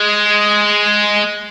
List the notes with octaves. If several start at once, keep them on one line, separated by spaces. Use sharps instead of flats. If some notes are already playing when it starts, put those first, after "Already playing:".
Already playing: G#3